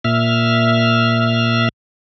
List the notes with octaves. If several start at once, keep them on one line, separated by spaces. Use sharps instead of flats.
A#2 E5 F6